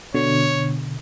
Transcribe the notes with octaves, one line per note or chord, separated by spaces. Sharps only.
B2 D3 C#5